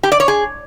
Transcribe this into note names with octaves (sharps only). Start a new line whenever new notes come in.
G4
D5
C#5
G#4